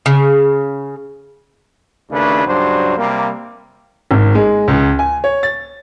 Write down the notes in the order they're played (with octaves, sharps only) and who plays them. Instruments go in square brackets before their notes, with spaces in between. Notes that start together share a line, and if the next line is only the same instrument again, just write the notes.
[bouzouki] C#3
[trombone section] D#2 C#3 A3 D4 B4
C#2 G2 F#3 D4 C5
C3 G3 A#3
[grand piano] G#1
G#3
C#2
G#5
C#5
A6